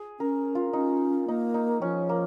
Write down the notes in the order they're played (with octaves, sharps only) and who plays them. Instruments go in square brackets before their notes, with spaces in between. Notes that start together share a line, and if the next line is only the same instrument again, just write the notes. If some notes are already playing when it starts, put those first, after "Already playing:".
Already playing: [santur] G#4
[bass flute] C#4 [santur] A#4
[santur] F4
[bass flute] C#4 [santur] D#4
[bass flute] A#3 [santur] D#4
[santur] D#4
[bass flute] F3 [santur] C#4
[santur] A#3